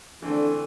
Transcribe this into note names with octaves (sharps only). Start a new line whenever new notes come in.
D3 E3 A3 C4